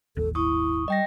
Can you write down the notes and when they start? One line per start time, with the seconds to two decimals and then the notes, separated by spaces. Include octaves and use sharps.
0.17 D#1 G#1 D#2 A4
0.35 E4 C#6 D#6
0.88 G3 D#5 G5 A#6